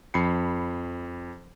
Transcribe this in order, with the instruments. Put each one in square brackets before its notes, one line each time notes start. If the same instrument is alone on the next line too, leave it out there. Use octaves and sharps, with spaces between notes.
[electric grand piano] F2 B5 C7 C#7